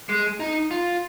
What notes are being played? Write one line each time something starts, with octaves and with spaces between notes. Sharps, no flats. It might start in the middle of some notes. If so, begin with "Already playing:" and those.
G#3
D#4
F4